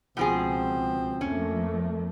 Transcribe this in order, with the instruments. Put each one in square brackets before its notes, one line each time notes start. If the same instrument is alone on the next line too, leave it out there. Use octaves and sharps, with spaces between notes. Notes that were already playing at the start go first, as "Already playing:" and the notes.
[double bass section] C#2 [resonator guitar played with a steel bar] B2 F3 G#4 [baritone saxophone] C4
[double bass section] F2 A3 A#3 [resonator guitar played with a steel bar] C#4